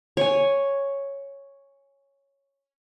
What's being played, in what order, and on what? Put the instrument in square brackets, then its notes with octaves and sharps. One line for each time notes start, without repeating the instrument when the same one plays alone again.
[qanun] C#5 G#5